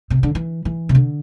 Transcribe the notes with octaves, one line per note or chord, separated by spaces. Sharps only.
C3
D3
E3
E3
C3
D3